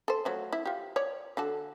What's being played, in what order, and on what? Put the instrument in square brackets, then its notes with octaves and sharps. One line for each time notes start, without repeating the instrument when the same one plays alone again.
[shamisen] A4 C5
F3 F#3 A3
E4
F4 G4
C#5 D5
D3 F#4 A4